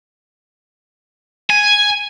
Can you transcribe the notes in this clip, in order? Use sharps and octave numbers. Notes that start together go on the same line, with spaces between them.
G#5